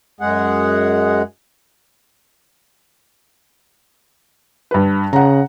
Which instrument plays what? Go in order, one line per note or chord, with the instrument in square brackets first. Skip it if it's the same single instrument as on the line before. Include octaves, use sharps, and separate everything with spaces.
[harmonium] F#2 G#3 G#4 F#5
[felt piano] G2 B4
[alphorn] C#3 [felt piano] F#5 A#5